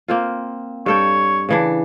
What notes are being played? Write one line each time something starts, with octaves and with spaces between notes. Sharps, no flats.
A#3 C4 F4
G2 A4 C#5 G5
C#3 E3 D4